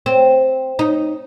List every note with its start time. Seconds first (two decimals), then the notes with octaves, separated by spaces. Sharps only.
0.06 C4
0.79 D#4